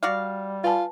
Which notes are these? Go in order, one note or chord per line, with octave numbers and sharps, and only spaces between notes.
G3 F#4 D5 F5
F4 B4 G#5 A5